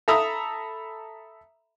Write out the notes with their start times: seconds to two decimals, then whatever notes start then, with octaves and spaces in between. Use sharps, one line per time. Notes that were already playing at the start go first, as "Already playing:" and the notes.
0.08 A4 E5 A#5 B5 D#6 E6